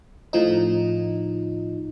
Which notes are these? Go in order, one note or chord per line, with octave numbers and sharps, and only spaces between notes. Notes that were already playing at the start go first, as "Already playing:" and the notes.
A2 F3 D#4